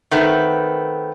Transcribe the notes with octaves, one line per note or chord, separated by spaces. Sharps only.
D#3 A3 B3 C4